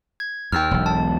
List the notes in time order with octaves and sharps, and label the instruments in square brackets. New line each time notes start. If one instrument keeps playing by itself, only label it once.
[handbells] G#6
[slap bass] D#2 [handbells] G5 E6 F6
[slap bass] E1 B1
[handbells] A5